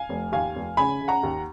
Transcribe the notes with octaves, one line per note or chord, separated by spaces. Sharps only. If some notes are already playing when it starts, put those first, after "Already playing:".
Already playing: F5 G#5
F1
D#2 F5 G#5
F1
C#3 G#5 B5
C#3
F#5 A#5
D#2